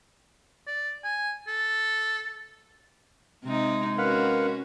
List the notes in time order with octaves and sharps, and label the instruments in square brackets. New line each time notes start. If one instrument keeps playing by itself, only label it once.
[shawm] D5
G#5
A4
[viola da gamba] C3 D#4 [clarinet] G#3
[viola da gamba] C#4 F#4 [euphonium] A#4 [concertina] B4 F5 F#5